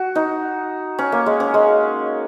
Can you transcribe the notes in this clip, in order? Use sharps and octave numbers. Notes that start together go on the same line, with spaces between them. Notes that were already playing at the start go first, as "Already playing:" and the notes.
Already playing: F#4
D#4
C#4
A#3
G#3
C#4
G#3